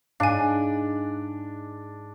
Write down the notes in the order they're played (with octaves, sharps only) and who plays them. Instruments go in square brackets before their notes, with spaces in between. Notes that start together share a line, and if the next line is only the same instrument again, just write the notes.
[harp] G#2 [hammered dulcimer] D4 [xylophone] F5 G#5